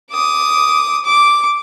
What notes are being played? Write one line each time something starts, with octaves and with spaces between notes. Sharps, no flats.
D6 D#6
D6